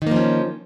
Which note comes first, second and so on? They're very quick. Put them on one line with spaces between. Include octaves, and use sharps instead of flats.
D#3 A#3 F3 C#4